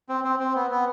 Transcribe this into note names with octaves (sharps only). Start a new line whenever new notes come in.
C4
C4
C4
B3
B3